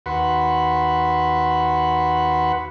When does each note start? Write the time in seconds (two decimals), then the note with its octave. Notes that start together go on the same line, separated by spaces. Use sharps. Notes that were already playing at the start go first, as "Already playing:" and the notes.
0.06 D#2 F#4 B4 F#5 B5 C6